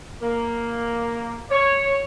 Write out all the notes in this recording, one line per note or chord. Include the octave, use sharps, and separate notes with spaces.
A#3
C#5